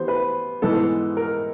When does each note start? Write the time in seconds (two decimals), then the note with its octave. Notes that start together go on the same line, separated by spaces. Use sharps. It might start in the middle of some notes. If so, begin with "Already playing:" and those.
Already playing: E3 G3 B3 C5
0.08 B4
0.62 G#2 E3 G#3 B3 A4
1.17 A#4